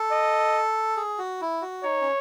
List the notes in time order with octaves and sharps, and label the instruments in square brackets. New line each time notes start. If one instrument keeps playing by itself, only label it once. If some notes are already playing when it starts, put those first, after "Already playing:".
Already playing: [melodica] A4
[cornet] D#5
[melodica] G#4
F#4
E4
F#4
[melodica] D#4 [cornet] C#5
[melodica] C#4